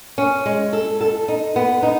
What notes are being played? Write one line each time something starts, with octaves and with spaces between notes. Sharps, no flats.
C#4
G#3
A4
A4
D#4
B3
D#4